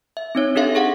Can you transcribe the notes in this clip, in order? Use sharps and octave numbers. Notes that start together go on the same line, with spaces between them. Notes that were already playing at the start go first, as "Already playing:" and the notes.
E5
C4 D#4 C#5
D4 G4 A4 E5 F5
G#4 F5 F#5